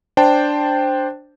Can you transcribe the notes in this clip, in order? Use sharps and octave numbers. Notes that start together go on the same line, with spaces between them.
D4 C5 G5 A5